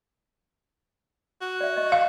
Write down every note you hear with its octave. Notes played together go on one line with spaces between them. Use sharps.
F#4
D5 E5
D#5 C#6 D6
F5